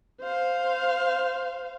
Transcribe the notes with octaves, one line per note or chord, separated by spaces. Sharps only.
C5 F5